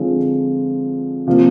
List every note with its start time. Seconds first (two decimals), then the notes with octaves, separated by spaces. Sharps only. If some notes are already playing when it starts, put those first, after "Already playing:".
Already playing: D3 F3 G#3 C4 F4
1.27 C3 F3 A#3